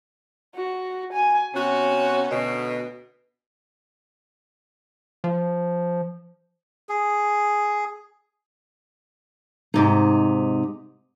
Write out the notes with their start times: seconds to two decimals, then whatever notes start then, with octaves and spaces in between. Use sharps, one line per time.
0.56 F#4
1.13 G#5
1.55 C3 B3 C#4 F#4
2.29 D2 B2
5.24 F3
6.89 G#4
9.74 G#2 C3 D#4